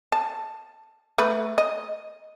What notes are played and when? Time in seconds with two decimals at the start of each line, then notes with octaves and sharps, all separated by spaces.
0.12 A5
1.18 A3 B4
1.58 D#5